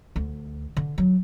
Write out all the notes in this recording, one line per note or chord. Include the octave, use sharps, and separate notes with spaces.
D2
D3
F#3